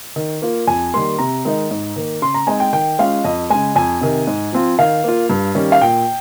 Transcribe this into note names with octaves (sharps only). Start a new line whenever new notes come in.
D#3
A#3 F4
F2 G#5
D#3 G3 A#3 C6
C3 A#5
D#3 G#3 D#4
G#2
D#3 A#3
C#3 C6
A#5
G#3 C4 D#4 G#5
G5
D#3 G5
G#3 C#4 F4 F5
F2 D#5
C#3 G#3 G#5
F2 G#5
C3 D#3
G#2
F3 C4 F4
D#3 F5
A#3 F4
G2
D#3 G3 C#4
F5
A#2 G5